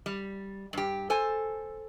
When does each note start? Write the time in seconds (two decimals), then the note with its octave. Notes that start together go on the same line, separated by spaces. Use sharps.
0.06 G3
0.73 G2 G4
1.10 A4 C5 G#5